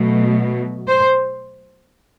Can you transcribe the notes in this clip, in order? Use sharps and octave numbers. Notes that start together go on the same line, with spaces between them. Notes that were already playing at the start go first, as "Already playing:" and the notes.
Already playing: B2 F#3 A3
C5